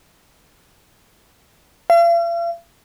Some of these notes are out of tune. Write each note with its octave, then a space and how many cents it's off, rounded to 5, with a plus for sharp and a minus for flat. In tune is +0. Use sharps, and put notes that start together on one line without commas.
F5 -45